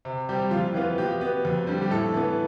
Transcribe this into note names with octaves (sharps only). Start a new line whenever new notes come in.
C3
G3 C4 G4
F2 F4
E3 B3 F4
B2 G4
B3
F2
D3 G3
G4
A2 A4
E3 B3